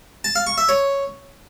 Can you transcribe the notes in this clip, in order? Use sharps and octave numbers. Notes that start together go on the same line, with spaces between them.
A5
F5
C#6
E5
C#5